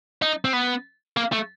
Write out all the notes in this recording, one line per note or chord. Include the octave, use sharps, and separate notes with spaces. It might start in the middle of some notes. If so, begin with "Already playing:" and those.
D#4
C4
B3
A#3
A3